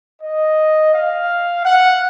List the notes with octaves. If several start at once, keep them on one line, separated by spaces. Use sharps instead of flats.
D#5
F5
F#5